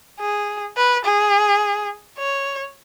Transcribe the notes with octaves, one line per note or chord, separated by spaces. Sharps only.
G#4
B4
G#4
C#5